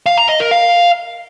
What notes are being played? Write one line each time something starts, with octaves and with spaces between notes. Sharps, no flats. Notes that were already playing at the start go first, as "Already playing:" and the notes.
F5
A#5
D#5
A#4
F5